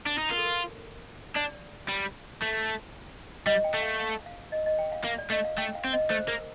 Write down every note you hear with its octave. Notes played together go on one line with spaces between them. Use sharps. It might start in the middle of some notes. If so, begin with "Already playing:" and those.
D4
D#4
F4 A#4
A4
A#4
D4 D5
G3
A3
G3 D#5
G5
A3
F5
F5
F5
D#5
D#5
G5
F5
A#3 F5
D5
A3 D#5
F5
A3 G5
F5
C4
D#5
A3 C5
A#3 A#4